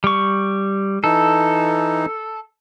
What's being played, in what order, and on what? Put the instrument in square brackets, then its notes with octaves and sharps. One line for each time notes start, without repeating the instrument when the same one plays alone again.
[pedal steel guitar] G3 C#6
[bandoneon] E3 D#4 [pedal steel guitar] A4